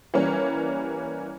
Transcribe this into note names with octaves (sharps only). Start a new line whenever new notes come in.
E3 G3 A#3 C#4